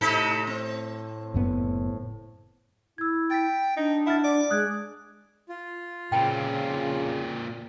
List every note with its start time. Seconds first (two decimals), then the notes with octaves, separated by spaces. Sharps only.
0.01 A2 C3 D#4 A4
0.47 C4
1.34 F#1 F#2 B3
2.98 E4 E6 G#6
3.31 G5 A6 B6
3.77 D4 D#4
4.06 E4 F#5 F6 A6
4.24 D5
4.50 G#3 D#6 F#6 G#6
5.49 F4
6.12 A#2 C#3 C4 G5 A5 B5